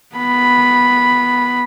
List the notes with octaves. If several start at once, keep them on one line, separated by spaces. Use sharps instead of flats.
B3 B5